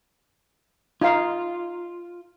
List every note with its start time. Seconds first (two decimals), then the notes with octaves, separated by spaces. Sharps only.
1.01 D#4 F4 F5